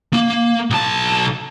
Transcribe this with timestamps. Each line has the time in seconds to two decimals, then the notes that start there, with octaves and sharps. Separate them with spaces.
0.13 A#3
0.70 B1 A5